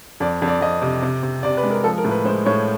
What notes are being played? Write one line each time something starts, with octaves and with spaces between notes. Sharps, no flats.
F2 D5
F2
D5
F2 D#5
C3
C3
C3
C3 D5
B4
G#3
A#4
F3 A4
A#4
A2
B4
G#3 C5
A2 C#5